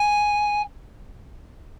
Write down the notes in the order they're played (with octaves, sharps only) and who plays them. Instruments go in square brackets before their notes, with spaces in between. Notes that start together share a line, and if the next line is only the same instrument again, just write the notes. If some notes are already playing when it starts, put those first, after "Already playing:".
Already playing: [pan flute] G#5